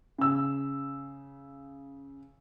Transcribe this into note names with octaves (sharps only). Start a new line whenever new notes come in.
C#3 E6